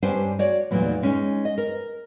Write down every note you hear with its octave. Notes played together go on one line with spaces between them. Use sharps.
G2 C#4 D4 G4 C5 G#5
F#4 C#5 D5
E2 A#2 F#3 G3 A3 D#4
G#3 C#4 D#4
D#5
A#4